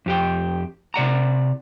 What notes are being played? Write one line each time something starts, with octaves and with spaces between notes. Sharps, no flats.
F2 G4 G5
C3 D5 F#5 A#5